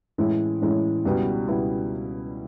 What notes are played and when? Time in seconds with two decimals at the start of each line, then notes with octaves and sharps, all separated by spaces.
0.18 A2 E3 G#3 C#4 E4
0.61 A2 E3 G#3 C#4 E4
1.05 C#2 B2 G3 B3 E4
1.48 C#2 B2 G3 B3 E4